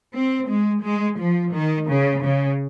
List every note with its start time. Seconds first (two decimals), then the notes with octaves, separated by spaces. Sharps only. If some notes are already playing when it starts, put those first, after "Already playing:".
0.13 C4
0.47 G#3
0.83 G#3
1.17 F3
1.52 D#3
1.87 C#3
2.22 C#3